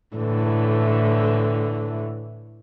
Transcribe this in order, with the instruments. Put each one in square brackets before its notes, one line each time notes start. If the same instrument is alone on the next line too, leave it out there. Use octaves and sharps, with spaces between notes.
[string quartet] A2 D3 E3